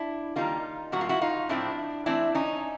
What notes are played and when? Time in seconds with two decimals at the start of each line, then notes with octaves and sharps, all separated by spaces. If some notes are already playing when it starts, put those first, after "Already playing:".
Already playing: D4 E4
0.36 D#3 G3 A#3 D#4 F4
0.92 A2 F#3 A#3 F#4
1.01 F4
1.09 E4 F#4
1.21 D#4 F4
1.49 A2 F3 A3 C4 D4 E4
2.06 E3 A3 C4 D4 E4
2.35 C#4 D#4